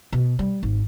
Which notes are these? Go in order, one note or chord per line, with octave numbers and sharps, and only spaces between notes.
B2
G3
G#1